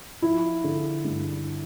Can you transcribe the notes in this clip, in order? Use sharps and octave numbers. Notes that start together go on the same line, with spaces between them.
F3 E4
D3
G2